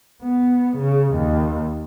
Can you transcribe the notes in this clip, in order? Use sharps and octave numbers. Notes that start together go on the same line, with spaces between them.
B3
C#3
D#2